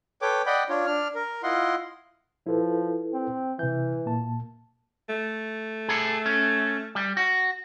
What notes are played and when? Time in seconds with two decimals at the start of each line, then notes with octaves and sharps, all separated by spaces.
0.22 A4 B4 C#5 G5 D6
0.46 D5 D#5 F#5 G5 B5
0.69 D4 F4 C#5
0.86 D4 F6
1.15 A#4
1.43 E4 F4 D#5 F#5 C6
2.47 F3 E4 A4 B4
3.13 C4
3.59 C3 E3 G6
4.06 A#2 A#3 A5
5.09 A3
5.88 G#4 A4
6.26 C#4
6.95 G3
7.17 F#4